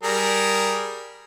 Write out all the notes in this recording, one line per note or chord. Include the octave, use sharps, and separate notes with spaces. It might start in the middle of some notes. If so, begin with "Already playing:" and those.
G3 G#4 A#4